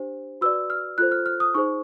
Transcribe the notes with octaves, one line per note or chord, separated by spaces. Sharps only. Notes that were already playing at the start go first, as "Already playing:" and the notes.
Already playing: D4 G4 C5
F#4 B4 D5 E6
F6
F4 A4 C5 F#6
F6
F6
D#6
D#4 G#4 C5 C#6